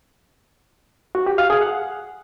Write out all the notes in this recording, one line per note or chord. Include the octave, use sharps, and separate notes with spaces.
F#4
G4
F5
G#4
F#5